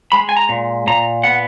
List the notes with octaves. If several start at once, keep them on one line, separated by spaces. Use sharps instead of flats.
G#3 B5
G#5
A#5
A#2
A#2 A#5
B3 F#5